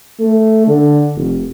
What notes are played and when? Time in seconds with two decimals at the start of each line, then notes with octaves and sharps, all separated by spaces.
0.20 A3
0.67 D3
1.16 F1